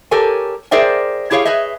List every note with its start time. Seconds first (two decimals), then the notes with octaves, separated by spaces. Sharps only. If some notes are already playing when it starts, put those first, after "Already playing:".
0.11 G4 A4 A#4 C#5 G#5
0.71 G#4 A#4 C5 D5 E5 G5
1.31 E4 G4 G#4 C#5 F5
1.45 G#4 B4 C#5 D#5 E5